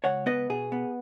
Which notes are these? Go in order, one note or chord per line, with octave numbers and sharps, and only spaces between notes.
C#2 C#5 F#5
B3 B4 D#5
B2 G#4
B3